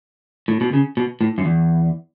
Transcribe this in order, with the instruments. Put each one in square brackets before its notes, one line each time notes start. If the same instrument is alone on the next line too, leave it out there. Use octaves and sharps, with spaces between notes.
[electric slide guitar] A2
B2
C#3
B2
A2
F#2
E2